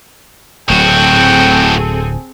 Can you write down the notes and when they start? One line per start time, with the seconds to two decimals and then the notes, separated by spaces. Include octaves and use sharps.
0.70 D1 A2 F#3 C4 F#4 G#4 A4 G5